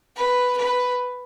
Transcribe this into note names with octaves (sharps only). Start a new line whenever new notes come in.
B4
B4